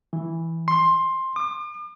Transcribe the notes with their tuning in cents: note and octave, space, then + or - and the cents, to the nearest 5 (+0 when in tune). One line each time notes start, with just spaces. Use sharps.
E3 -5
C6 +10
D6 +45